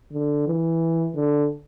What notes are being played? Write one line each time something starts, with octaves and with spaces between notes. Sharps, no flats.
D3
E3
D3